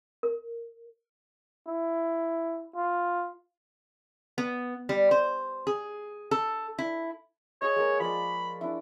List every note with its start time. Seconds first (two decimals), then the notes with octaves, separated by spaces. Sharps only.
0.23 A#4
1.67 E4
2.75 F4
4.38 B3
4.89 G3
5.11 C5
5.67 G#4
6.31 A4
6.79 E4
7.62 G#4 C#5 D#5
7.76 G#3 A#3 A#4
8.00 F3 C#5 D5 B5
8.61 D4 E4